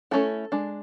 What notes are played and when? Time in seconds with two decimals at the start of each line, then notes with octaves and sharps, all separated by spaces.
0.11 A3 C#4 E4 A4
0.52 G#3 D4